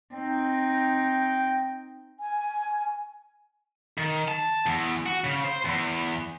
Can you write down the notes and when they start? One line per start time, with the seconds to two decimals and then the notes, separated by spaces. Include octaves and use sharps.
0.14 C4 D#4 G5
2.20 G#5
3.98 D#3
4.28 A5
4.66 E2
5.06 F#4
5.24 C#3
5.44 C5
5.65 E2